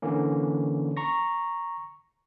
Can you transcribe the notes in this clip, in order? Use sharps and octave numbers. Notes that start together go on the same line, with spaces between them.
D3 E3 A#3 C#4
A#5 C#6 A#6